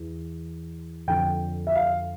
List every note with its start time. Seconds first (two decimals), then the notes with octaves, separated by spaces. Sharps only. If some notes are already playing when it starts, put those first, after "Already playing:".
Already playing: E2 E3
1.07 F2 D3 G5
1.67 E5
1.75 F5